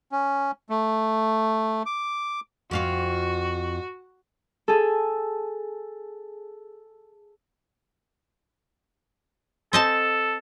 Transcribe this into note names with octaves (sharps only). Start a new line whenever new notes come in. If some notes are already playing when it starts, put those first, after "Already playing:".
C#4
A3
D6
F2 F4 F#4 F5
G#4 A4
C4 A4 D#5 A5